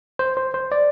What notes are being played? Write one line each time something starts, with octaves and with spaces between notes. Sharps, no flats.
C5
C5
C5
D5